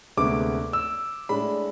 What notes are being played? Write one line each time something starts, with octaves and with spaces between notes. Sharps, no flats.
D2 C3 G#3 B3 D6
E6
A2 G#3 D4 B5